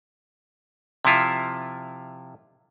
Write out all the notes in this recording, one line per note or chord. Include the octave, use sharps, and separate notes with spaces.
C3 F3 E4 F4